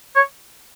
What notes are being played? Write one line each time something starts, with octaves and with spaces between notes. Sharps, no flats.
C#5